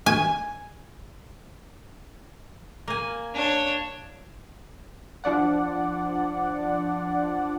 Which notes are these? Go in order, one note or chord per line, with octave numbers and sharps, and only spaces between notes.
G#5
A#3 G#5
D4 C#5
F3 D4 D5 F#5